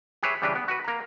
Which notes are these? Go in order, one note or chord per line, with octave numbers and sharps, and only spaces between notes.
G4 G#4 B4 C#5 E5
C#3 E3 G3 D4 G4 B4
B3
F#4 B4
A#3 A#5